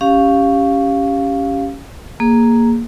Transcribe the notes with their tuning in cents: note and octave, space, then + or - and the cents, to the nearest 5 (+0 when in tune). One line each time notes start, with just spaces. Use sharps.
C#4 +0 G4 +0 F5 +0
A#3 +0 G#4 +0